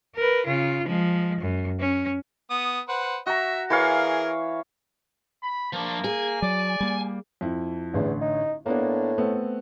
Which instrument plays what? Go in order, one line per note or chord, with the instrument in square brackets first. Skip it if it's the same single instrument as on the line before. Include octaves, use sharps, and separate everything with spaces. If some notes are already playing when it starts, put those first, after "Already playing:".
[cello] A#4 B4
C#3 F4
F3 G#3
F#2
C#4
[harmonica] B3 D#6
B4 C5 F#5
[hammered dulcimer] F#4 A#5 [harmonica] E5
[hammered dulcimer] E3 C#5 F5 [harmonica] G#4 A#4
[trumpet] B5
[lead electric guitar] F3 D4 [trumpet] A#3
[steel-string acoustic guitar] G#4 [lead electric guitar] G#5
[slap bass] F#3 [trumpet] D5
[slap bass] G3 A#3
[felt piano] F2 E4
[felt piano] A1 D3 [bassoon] E2
[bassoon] D#4
[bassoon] A2 [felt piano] A#3 B3 D4
[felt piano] A3 B3 C4